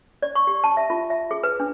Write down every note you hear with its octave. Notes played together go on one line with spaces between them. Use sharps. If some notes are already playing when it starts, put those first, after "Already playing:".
D5
C#6
G4
A5
E5
F4
E5
G#4
B4
D4